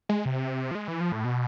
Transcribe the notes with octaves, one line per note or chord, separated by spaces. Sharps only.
G#3
C3
F3
G#3
E3
F3
A2
B2